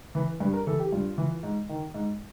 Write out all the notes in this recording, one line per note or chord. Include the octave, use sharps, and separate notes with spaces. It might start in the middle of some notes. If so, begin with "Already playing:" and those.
E3 B4
G2 B4
A#4
E3 A4
G4
G2 F4
E3
G#2
D#3
G#2